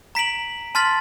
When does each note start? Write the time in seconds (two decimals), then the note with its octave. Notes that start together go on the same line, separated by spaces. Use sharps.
0.15 A#5 B6 D7 F#7
0.75 A5 C6 F6 A6 B6 F#7